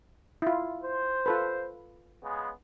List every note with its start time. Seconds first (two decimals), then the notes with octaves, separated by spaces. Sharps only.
0.42 E4 F4
0.82 C5
1.26 F4 A4 B4
2.22 C#3 G#3 B3